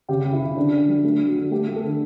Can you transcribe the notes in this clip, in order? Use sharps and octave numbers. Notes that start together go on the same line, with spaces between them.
C#3 G4
C#3
E4
C#3
D3 D4
D3
F#3
A3 D4
A3
F#4
D3
A3 G4
A3
A4
D3